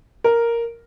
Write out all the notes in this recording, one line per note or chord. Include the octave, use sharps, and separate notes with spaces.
A#4